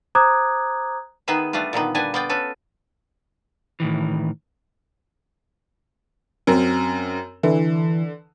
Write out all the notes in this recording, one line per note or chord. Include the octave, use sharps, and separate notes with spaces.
C5 A#5 D6 D#6 F#6 G#6
D#3 B3 G#4 B4 E5
G3 A3 D4 F4 B4
A#2 D3 D#3 B3
A#2 G3 D4 B4 G#5
B3 F4 D5 G5
C#4 A4 B4
A2 D#3 E3
F#2 C4
D3 E3